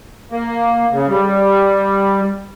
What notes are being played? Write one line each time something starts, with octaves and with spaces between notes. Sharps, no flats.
A#3
C#3
G3